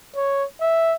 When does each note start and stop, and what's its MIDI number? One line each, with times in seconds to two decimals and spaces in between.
0.15 0.44 73
0.61 0.96 76